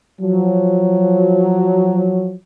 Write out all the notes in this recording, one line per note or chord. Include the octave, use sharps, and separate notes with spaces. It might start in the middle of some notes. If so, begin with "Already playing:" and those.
F3 F#3